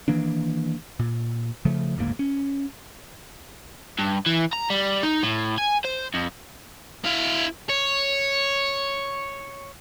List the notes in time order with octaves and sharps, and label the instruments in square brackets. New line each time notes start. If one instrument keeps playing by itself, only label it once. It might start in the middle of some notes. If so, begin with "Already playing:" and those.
[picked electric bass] D#3 E3 A#3 D4
A#2
C#3 F3 A3
F#1 D2 G#2 A#3
C#4
[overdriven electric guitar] G2
E3
A#5
G3
D#4
A2
G#5
C5
F2
[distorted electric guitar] E4 F5
C#5